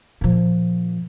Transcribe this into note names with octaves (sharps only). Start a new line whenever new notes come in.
A#2 F3